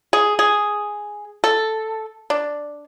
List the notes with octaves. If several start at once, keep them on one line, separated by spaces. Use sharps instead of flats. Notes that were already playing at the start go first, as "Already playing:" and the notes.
G#4
G#4
A4
D4